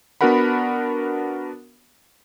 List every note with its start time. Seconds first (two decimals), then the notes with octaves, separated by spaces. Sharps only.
0.21 B3 D4 F#4 A#4 F#5 B5